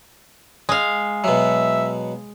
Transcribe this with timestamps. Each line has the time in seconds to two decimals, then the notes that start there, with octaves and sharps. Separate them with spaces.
0.69 G#3 F5
1.24 B2 F#3 E5